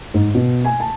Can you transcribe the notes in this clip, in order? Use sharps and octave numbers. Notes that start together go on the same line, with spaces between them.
G#2
B2
G#5
A5